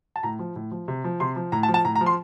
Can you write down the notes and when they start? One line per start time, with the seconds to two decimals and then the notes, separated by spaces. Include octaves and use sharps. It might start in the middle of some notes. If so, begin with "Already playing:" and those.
0.16 A5
0.23 A2 A#5
0.39 F3
0.56 A2
0.71 F3
0.88 C3
1.04 F3
1.20 C3 C6
1.36 F3
1.52 A2 A#5
1.63 A5
1.68 F3
1.74 A5
1.85 A2 A#5
1.96 A#5
2.01 F3
2.06 C6